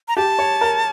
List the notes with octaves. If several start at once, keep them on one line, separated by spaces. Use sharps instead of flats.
A#5
G4 A5
C#5
A#4